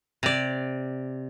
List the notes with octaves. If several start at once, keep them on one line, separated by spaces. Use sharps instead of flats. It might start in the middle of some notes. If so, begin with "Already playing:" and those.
C3 D5